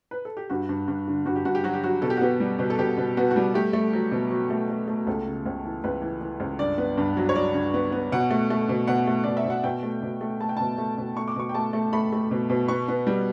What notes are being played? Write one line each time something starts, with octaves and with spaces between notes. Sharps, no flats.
B4
A4
G4
G2 F#4
G2
G2
D3
G2 F#4
G4
G2 F#4
G4
F#3 F#4
G4
F#3 F#4
B2 A4
G4
F#4
B3 G4
G3
B2
A4
B2 G4
B2
B3 F#4
F#4
G3
A3 G4
A3
F#3
B2
F#3
A3
A3
A3
C#2 A4
C#3
C#2
E3
C#2 B4
E3
E3
C#2
G2 D5
B3
G2
F#3
C#5
F#3 D5
G2
B3
B3
B2 F#5
A3
A3
B2
B2 F#5
A3
B2 D5
E5
B2 F#5
B2 G5
A3
B2
A3
A3 A5
G5
B2 A5
A3
B2
A3 C#6
D6
B2 C#6
G5
A3 A5
A3
A3 B5
A3
B2
B2
B3 C#6
B3
G3